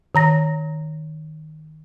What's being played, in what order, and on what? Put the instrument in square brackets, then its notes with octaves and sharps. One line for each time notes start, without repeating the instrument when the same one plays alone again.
[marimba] D#3 A#5 A#6